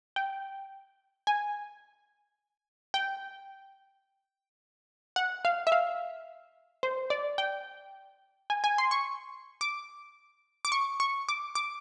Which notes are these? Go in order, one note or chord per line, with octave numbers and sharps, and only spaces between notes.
G5
G#5
G5
F#5
F5
E5
F5
C5
D5
G5
G#5
G#5
C6
C#6
D6
D6
C#6
C#6
D6
D6